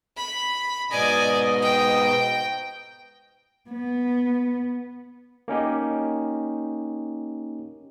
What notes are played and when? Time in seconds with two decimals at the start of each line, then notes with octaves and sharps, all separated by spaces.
0.17 B5
0.91 G#2 B2 D5 D#5 G#5
1.62 G5
3.70 B3
5.48 A#3 C#4 D#4 G4